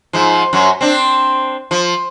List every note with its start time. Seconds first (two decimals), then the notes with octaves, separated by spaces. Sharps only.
0.13 G#2 F3
0.53 F#2 F#3
0.81 C4 D4
1.71 F3